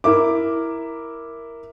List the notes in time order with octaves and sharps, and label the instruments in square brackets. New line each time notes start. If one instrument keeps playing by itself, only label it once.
[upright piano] E4 A#4 E5 D6